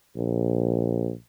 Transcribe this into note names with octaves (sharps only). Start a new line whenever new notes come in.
A#1